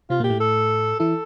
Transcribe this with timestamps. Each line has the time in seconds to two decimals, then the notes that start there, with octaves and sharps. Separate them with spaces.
0.10 C3 C4 F4
0.20 A#2 A#3 G4
0.30 A2 A3
0.40 A4
1.00 E3 E4 A4